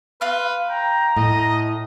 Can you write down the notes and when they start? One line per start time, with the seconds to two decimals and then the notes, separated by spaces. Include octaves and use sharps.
0.21 B4 F5 C6 F6
0.69 G5 A#5
1.17 A2 D#5